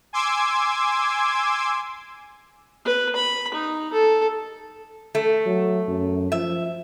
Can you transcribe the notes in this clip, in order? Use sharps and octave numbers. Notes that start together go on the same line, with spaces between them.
G#5 C6 D6 E6 G#6
B4
B5
D#4
A4
A3
F#3
F#2
F3 E5